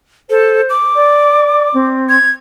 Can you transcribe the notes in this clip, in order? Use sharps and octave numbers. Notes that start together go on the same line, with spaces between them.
A4 C5
D6
D5
C4
G#6